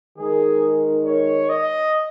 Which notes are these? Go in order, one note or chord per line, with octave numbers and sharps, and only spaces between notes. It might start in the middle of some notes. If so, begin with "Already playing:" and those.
D#3 G#3 D#4 G#4 A#4
C#5
D#5